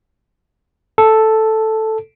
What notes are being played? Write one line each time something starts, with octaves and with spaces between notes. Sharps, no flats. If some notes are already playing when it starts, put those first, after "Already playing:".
A4